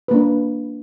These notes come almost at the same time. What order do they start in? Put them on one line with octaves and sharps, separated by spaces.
B4 A#3 D4